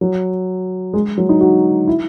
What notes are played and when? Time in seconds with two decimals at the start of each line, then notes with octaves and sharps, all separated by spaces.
0.01 F#3
0.93 G#3
1.18 F#3
1.29 D#4
1.41 F#4
1.88 E4